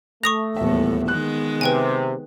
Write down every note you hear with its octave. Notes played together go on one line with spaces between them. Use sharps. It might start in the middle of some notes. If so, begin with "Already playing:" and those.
A3 C#6 D#6 A#6 F7
D#1 E2 A2 B3 E5
D#3 G#3 B3 F#6
C3 B4 G5 G#5